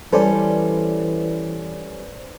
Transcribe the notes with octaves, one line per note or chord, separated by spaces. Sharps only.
E3 G3 C#4 A4 B4 C5 D5